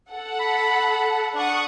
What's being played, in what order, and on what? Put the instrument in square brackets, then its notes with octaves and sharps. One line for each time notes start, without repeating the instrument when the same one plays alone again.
[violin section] A4 F#5
[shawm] B5
[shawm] D4 [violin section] F#5 C#6 D#6